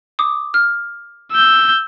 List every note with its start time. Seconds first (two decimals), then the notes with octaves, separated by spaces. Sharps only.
0.19 D6 D#6
0.54 F6
1.32 E6 G6